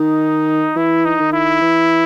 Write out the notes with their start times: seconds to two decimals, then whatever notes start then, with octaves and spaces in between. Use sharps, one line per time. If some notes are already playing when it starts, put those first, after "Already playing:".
Already playing: D#3 D#4
0.76 E3 E4
1.05 D#4
1.20 D#3
1.33 E4
1.62 E3